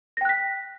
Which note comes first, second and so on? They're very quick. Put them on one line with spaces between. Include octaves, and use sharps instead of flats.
A#6 G5 F#6 B6